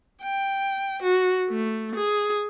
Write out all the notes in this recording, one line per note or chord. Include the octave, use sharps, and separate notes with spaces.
G5
F#4
A3
G#4